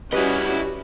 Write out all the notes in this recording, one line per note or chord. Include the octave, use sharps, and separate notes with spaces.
G3 C#4 E4 F#4 G4 B4 D#5